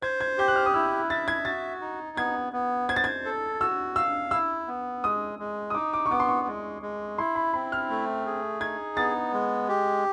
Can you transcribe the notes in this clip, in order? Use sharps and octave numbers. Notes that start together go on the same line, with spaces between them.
C5 G#6
G#6
G4 G6
F#6
F6
D#6
E4 E6
E5 A6
G#6
F#4 A6
D#4
B3 G#6
B3
C5 G#6
A6
G#6
A4
F#4 E6
F5 E6
E4 E6
B3
G#3 D#6
G#3
D#6
D#4 D6
D6
C#6
B3 D6
C6
C#6
G#3
G#3
E4 C6
B5
C4 B5
F6
A3
G#4
D#4 G#6
B3 A6
G#3
G4